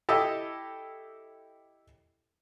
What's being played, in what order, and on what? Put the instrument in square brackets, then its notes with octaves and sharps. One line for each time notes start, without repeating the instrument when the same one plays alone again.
[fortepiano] E4 G4 A4 D#5 E5